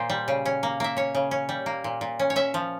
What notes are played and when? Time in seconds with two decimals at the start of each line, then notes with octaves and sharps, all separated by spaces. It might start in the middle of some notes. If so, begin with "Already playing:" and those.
Already playing: A#2 C5
0.10 G3
0.28 C#3
0.45 C#4
0.63 A#3
0.80 A#3 E5
0.96 C#4 C#5
1.15 C#3
1.31 C#4
1.49 G3
1.66 A#3
1.84 A#2
2.01 A#2
2.19 C#4
2.30 C#5
2.36 C#4 E5
2.54 F3